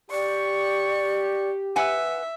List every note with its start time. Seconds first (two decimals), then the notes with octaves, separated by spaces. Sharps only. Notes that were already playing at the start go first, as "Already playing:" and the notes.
0.11 G4 D5 C#6
1.76 B4 E5 F#5 G#5